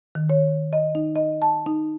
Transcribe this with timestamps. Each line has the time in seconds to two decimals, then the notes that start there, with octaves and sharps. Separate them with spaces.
0.15 D#3
0.30 C#5
0.73 D#5
0.95 D#4
1.16 D#5
1.42 A5
1.66 D#4